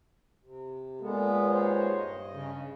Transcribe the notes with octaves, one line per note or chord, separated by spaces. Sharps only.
C3
A#2 G#3 A#3 B3 A4
D#2 C5 C#5
G2 D#5
C#3